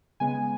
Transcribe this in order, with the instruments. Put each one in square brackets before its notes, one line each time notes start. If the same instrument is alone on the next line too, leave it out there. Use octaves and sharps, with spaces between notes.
[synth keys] C#3 G#3 B3 G#5